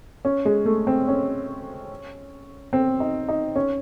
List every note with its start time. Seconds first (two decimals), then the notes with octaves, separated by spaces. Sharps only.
0.25 C#4
0.45 G#3
0.66 A3
0.87 C4
1.08 C#4
2.73 C4
3.00 D#4
3.29 D#4
3.56 C#4